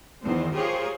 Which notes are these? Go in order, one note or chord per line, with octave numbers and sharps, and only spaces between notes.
E2 D#3 C4 C5
F4 G4 G#4 A#4 C5 C#5